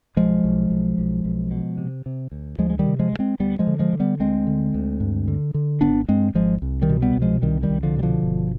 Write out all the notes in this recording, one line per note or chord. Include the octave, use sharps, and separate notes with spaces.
B1 F3 G#3
B1
B1
B1
B1
B2
C3
C3
D2
D2 F3 G#3
G#3
D#3 G3
C3
F3 G#3
D2
G#3 C4
D2 G3 B3
F3 G#3
D3
F3 G#3
D3
G3 B3
D2 G#3 C4
D3
D2
G2
D3
D3
G#1 B3 D4
G2 G#3 C4
G#1 F3 G#3
C2
D#3 G3
B2
G3 B3
C2
F3 G#3
C2 D#3 G3
D#3 G3
C2
D3 F3
B2 G3
D3 F3
G1